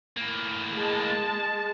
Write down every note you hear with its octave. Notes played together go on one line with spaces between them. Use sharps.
A2 A#3
G#3 A5